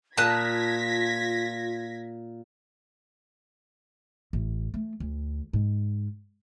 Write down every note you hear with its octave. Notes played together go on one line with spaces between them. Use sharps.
A#2 F4 A5 D#6 F#6 G#6 A#6 B6
A1
A3
D2
G#2